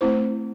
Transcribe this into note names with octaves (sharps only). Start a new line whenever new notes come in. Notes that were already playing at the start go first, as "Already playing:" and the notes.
A3 C4 E4 C5